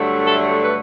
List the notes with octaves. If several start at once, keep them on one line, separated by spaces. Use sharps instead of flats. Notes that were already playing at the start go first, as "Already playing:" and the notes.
Already playing: G2 D3 F#3 A3
A4
B4